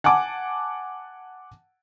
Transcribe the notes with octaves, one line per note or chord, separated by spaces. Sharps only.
F#5 G#5 A5 D6